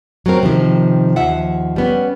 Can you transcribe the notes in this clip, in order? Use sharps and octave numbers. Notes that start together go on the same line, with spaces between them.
F#3 A3 C4 A#4
C3 D#3 F3
D#2 F3 E5 F#5
G3 B3 C#4